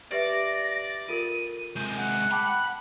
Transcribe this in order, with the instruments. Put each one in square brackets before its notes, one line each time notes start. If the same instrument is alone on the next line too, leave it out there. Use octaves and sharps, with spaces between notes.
[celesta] G4 B4 E5 [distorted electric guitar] D5 [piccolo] A#6
[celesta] F4 A4 A#4 [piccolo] D#7
[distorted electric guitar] C3 G#3 [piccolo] G6
[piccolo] F#5
[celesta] G5 A5 D6 [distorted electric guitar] B5